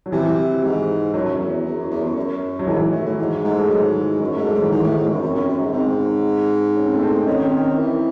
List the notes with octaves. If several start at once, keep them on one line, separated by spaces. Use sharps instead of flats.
F#3
C3 E3
G#2
F#2 F#3
E2
E2
F#2
E2
F#2
F#2
F#3
G#2 E3
A2
A2
G#2
G#2 A3
G#3
G#2 F#3
F#2
G#2 A3
G#3
G#2 F#3
E3
G#2 D#3
A2
G#2
F#2
F#2 C4
C#4
F#2 C4
F#2
G#2
G#2 C4
C#4
C4
A3
C4
D#3 C#4
C4
C#4
E3